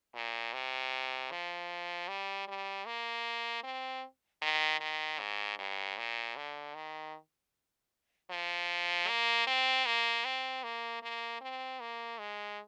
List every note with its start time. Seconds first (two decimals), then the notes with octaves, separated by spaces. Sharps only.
0.14 A#2
0.53 C3
1.31 F3
2.08 G3
2.48 G3
2.86 A#3
3.64 C4
4.42 D#3
4.80 D#3
5.19 G#2
5.58 G2
5.97 A#2
6.36 D3
6.75 D#3
8.30 F3
9.08 A#3
9.47 C4
9.86 A#3
10.25 C4
10.64 A#3
11.03 A#3
11.41 C4
11.80 A#3
12.19 G#3